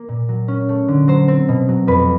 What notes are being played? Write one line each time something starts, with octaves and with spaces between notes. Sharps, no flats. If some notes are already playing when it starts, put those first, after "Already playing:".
Already playing: A#3
A#2
F#3
C#4
A3
D3
F#3 C5
C4
B2
F#3
F2 B4